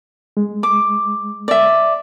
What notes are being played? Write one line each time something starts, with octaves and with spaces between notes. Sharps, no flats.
G#3
D6
D5 E5